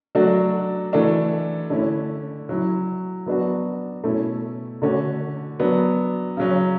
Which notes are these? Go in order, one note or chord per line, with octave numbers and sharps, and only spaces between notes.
F#3 A3 D4 F#4
E3 A3 D4 F#4
D3 A3 C#4 E4
F#3 C#4 E4
F#3 B3 D4 F#4
B2 A3 C#4 E4
D3 A3 C#4 F#4
F#3 B3 D4
C#3 F#3 C#4